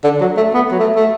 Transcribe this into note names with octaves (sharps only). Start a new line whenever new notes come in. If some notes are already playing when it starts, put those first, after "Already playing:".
D3
F#3
A3
B3
F#3
A3
A3